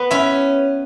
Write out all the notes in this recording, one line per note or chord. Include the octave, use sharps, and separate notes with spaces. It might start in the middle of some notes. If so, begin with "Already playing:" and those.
Already playing: B3 B4
C#4 E4